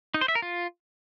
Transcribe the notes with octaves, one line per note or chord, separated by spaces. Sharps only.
D#4
C5
E5
A#4
F4